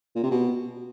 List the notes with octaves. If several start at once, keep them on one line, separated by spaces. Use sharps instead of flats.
A#2
C3
B2